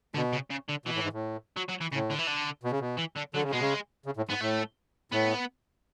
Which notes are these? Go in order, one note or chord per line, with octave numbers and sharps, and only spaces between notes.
B2 D3
C#3
C#3
D3
B2 E3
A2
G#2
A2
F#3
F#3
E3
A2 C#3
D3
E3
D3
B2
C#3
B2
E3
D3
D3 F#3
C#3
B2 G#3
C#3
C#3
A2
G#2 B3
A2 A3
A2 B3